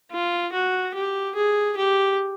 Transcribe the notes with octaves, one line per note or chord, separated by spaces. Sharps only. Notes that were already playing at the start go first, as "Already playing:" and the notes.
F4
F#4
G4
G#4
G4